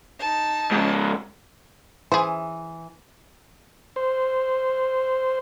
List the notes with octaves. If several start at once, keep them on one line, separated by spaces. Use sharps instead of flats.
D#4 A5
G#2 C#3
E3 G#4 C5
C5